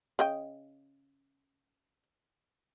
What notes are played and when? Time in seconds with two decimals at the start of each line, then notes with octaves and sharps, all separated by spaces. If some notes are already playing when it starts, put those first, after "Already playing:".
0.19 C#3 D#5 G5